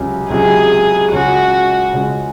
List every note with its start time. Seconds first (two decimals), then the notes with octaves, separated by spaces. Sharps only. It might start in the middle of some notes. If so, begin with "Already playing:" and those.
Already playing: C#2 C3 F#3 C#4
0.30 C#2 C3 F#3 C#4 G#4
1.12 C#2 C#3 G#3 C#4 F#4
1.93 C#2 C#3 G#3 C#4